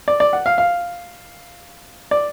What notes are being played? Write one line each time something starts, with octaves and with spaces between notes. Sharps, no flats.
D5
D5
F#5
F5
F5
D5